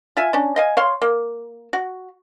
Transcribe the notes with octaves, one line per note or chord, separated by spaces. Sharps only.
F4 E5 G#5
C#4 D4
D#5 F5 G#5
C#5 F5 C6
A#3
F#4